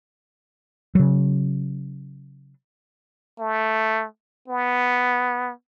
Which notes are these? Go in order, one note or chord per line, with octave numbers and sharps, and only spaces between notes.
C#3 F#3
A3
B3